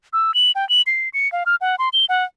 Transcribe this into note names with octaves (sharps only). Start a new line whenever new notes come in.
E6
F#7
G5
F#7
C7
C#7
F5
F6
F#5
C6
G7
F#5